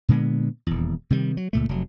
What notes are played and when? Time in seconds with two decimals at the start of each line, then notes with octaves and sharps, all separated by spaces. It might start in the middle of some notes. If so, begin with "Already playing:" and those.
0.09 A#2 D3 G#3 B3
0.67 D#1 E2
1.10 C3 D#3 G3
1.37 F#3
1.53 C#2 A#2 A3
1.69 F1 F#3